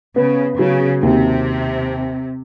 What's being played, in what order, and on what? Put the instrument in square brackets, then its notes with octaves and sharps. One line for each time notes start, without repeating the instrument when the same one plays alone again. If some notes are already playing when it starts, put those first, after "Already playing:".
[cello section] C#3 [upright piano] B3
[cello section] C#3 [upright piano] F#3
[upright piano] D#2 [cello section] C3